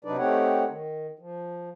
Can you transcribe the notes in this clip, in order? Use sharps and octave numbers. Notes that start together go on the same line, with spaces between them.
C3 F#3 D4 D#4 B4 D5
A3 C4 D#4 G4 C#5 F#5
D#3
F3